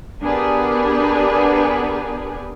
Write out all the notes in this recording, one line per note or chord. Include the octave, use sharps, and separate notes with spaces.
B3 D4 G4 G#4 A#4 B4